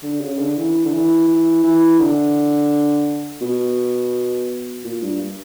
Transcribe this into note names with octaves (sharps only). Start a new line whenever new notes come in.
D3
C#3
D3
E3
D3
E3
E3
E3
D3
B2
A#2
G2